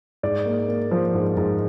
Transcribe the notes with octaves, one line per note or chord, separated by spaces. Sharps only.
G#2 D5
A#3
A#3
F3
G#2
G#2